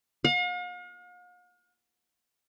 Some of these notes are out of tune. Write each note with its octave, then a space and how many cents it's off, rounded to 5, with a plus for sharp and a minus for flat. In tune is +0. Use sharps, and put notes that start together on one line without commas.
F5 +45